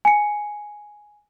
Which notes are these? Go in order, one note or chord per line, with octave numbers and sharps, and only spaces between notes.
G#5 C#7